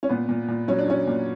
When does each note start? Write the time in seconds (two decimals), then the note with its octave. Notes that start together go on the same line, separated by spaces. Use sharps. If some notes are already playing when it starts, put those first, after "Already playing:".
0.03 C#4
0.09 A#2 B3
0.29 A#2
0.48 A#2
0.68 F#3 C#4
0.79 D4
0.87 F#3 C#4
1.07 A#2